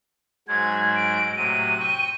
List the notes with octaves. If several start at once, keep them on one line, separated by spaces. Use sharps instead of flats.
G#2 F#3 G#3 G#6
D7
A2 C3 F#3 D#7
G5 C#6